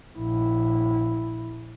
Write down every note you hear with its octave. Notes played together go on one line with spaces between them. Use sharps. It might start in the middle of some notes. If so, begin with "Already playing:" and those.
A#1 E4